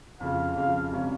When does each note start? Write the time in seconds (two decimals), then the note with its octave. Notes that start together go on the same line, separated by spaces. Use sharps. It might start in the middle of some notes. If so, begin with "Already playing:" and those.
0.20 F2 C#3 F3 F5
0.55 F2 C#3 F3
0.91 C#2 C3 G3 C#4 F4